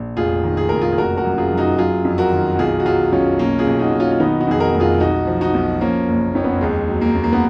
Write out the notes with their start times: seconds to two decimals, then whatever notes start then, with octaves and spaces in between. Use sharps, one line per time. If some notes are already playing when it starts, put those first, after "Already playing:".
Already playing: A#1
0.17 F1 F4 G#4
0.43 D#3
0.57 G#4
0.69 F1 A#4
0.81 F4 G#4
0.92 G#4
0.97 F#1 F#4 A#4
1.17 F#4 A#4
1.24 F#2
1.38 F4 G#4
1.52 F#2
1.57 D#4 F#4
1.78 F#3 F4 G#4
2.05 F2
2.18 F#4 A#4
2.32 D#3
2.53 F#4
2.59 B1 F4 G#4
2.80 F#4
2.85 F#3 F4 G#4
3.12 B1 C#4 F4
3.39 B1 A#3 C#4
3.59 F4 G#4
3.66 B1
3.79 D#4 F#4
3.93 B1
4.00 C#4 F4
4.11 F4
4.20 D#3 B3 D#4
4.40 D#4 F#4
4.47 F2 G#4
4.60 F#4 A#4
4.74 F1
4.80 F4 G#4
5.00 B1 D#4 F#4
5.27 F3
5.41 D#4 F#4
5.54 B1
5.81 F3 A#3 C#4
6.08 F#1
6.35 F2 C#4
6.44 B3
6.53 A#3
6.61 D#2 G#3
6.88 F#3
7.01 A#3
7.15 D#2
7.24 A#3
7.33 B3